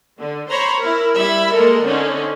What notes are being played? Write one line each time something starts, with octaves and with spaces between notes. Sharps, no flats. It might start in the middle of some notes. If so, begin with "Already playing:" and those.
D3
C5 C#5 A#5 B5
E4 A#4
G3 E4 E5 B5
G#3 A#3 A4 A#4
D3 C4 C#4 D#4